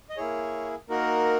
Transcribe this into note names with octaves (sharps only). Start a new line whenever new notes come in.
D#5
A#3 E4 G#4 C#5
A#3 D#4 F#4 A#4